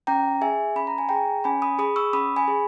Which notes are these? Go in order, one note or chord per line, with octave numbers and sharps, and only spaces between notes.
C#4 G5 A#5
G#4 E5 G#5
C#4 B5
A#5
G#5
G#4 G5 A#5
C#4 G#5 B5
B5 D#6
G#4 B5 D#6
C#6 E6
C#4 B5 D#6
G#5 B5
G#4